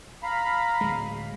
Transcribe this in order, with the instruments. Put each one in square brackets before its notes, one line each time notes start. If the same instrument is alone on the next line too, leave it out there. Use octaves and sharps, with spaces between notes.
[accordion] F5 A#5 B5
[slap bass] D1 G#3